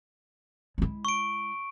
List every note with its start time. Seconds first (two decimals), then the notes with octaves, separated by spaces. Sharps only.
0.78 G#3 E4
1.05 C#6 D7